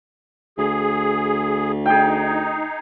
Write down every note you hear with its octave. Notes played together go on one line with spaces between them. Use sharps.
D2 G#4
D#4 G#4 G5